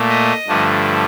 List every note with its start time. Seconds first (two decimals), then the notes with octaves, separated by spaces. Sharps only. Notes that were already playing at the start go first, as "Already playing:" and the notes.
Already playing: A#2 A3
0.09 D#5
0.48 G2 D3 F3 A3